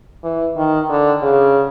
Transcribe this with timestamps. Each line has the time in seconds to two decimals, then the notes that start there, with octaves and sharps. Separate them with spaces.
0.24 E3
0.57 D#3
0.89 D3
1.23 C#3